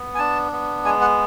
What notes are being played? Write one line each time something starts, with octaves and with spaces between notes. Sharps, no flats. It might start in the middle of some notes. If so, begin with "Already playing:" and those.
Already playing: B3
G#5
D4 A5
B3
G#3 G#5
F#5